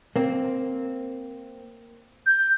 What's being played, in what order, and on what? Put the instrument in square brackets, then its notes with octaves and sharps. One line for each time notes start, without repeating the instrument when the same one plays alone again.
[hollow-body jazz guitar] A#3 C4
[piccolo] G6